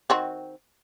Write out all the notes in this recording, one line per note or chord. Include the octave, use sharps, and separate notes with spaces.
D#3 C4 F#4